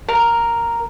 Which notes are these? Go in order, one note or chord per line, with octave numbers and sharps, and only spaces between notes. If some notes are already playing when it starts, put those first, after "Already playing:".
A#4